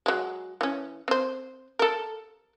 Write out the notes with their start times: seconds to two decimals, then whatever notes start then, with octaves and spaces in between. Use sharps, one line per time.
0.06 F#3 G#3
0.61 E3 C#4
1.08 C4 C5
1.79 A4 A#4